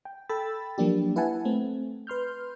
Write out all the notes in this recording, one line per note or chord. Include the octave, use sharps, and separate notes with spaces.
G5
A4 G5 B5 E6 A6
F3 F#3 A#3 D4 G4
E4 B4 E5 F#5 G#5 A5
A3 C4
B4 C6 F6 G6